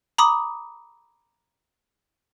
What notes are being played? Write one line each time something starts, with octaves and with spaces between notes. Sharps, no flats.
A#5 B5 D6 D#6